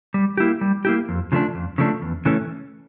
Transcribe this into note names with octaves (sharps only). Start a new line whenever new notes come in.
G3
A#3 E4 G4
G3
A#3 E4 G4
F2
C#3 F3 A3 D4
F2
C#3 F3 A3 D4
E2
C#3 E3 A3 C#4